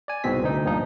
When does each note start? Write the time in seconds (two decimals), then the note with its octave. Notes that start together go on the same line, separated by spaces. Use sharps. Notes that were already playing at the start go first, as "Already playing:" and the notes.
0.08 D5 G#5
0.24 C2 G#2 B2 C4 B6
0.43 D2 D#4
0.65 G2 A#2 F3 D#4